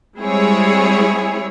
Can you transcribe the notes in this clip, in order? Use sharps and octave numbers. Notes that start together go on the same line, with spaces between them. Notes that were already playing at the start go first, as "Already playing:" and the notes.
G3 G#3 C4 E4 G#4 C#5